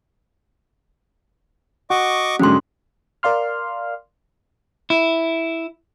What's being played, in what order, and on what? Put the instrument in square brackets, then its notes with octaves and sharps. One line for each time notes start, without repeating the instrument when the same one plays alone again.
[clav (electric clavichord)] F#4 [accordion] D#5 C#6 D6
[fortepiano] G#2 D3 F#3 [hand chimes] C#4 C6
[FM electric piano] A#4 D5 F5 C6 F6
[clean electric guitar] E4